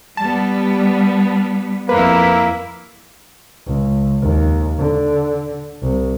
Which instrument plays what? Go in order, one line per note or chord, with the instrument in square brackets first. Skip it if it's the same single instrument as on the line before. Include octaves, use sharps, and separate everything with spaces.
[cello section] G3 B3 [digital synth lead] A5
[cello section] F2 E4 [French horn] A#3 [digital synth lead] B4
[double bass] C#2
D#2
D3
C2